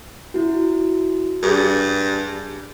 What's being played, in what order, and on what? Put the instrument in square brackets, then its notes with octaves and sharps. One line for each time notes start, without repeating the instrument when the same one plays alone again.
[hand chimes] E4 F#4
[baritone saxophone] G2 [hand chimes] G#4